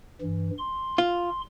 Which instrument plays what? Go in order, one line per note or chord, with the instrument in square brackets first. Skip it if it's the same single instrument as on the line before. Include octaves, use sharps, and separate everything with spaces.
[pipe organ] G2 E3
C6
[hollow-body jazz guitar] F4